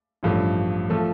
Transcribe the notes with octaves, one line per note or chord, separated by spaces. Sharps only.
A1 G2 F3 A3
F3 A3 A4